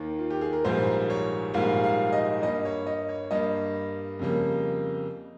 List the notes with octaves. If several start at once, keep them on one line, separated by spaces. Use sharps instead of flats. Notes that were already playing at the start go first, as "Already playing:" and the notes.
Already playing: D#2 D#3 A#3
F4
G4
G#4
A#4
A#1 G#2 G3 A#3 C5
C#5
A#1 G#2 G3 A#3 F5
F5
D#5
G2 G3 A#3 D#5
C#5
D#5
C#5
G2 G3 A#3 D#5
F2 C#3 G3 A#3